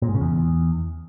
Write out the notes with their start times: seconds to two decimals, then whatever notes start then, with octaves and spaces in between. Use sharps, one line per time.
0.02 A#2
0.08 G#2
0.15 C#3
0.21 E2